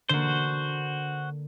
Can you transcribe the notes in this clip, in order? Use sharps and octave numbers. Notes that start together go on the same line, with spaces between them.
D3 A#3 F#4 C5